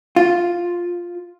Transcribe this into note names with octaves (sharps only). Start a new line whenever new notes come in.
F4